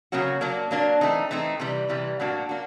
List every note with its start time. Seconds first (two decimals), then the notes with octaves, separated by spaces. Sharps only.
0.12 C#3 F#3 A#3 C#4 F#4
0.41 F#3 A#3 D4
0.71 F#3 A#3 D4
1.01 E3 A3 C4 D#4
1.31 E3 A3 C4 D#4
1.60 C3 E3 G3
1.89 C3 E3 G3
2.20 A2 F#3 A#3 D4 F#4
2.49 A#3 D4 F#4